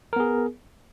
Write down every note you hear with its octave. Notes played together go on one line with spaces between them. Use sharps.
B3 G#4 A#4